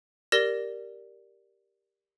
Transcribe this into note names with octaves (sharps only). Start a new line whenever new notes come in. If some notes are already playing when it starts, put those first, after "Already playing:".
G4 A#4 D5 A#6 G7